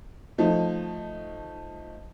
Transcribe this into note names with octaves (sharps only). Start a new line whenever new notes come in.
F3 A3 D#4